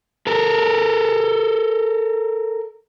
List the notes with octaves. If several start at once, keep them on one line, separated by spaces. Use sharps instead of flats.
A4 A#4